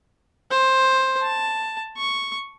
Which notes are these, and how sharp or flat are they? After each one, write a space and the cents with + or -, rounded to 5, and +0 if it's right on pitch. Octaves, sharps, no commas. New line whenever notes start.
C5 +10
A5 +5
C#6 +0